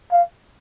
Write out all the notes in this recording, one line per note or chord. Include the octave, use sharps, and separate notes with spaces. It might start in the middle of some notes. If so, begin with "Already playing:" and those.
F5